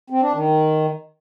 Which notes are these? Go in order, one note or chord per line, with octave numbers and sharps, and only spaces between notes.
C4
D4
D#3